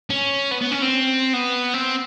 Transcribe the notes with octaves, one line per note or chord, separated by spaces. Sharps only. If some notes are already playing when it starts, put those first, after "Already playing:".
C#4
B3
B3
C#4
C4
B3
C4